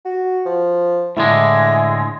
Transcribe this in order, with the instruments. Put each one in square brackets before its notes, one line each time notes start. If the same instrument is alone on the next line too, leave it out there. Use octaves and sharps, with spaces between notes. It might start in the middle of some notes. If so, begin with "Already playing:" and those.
[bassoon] F#4
F3
[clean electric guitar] A2 D3 G#3 [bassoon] E4